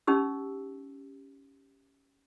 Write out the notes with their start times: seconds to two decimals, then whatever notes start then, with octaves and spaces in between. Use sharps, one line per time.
0.07 C#4 D#4 G4 E6